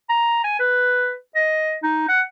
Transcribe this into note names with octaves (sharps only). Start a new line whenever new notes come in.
A#5
G#5
B4
D#5
D#4
F#5